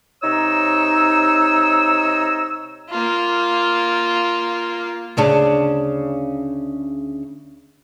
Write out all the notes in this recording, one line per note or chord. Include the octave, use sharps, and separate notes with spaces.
C3 D#4 C#5 A#5 E6
A#3 F4
D2 C#3 D4